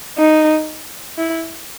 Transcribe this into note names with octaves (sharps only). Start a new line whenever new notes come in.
D#4
E4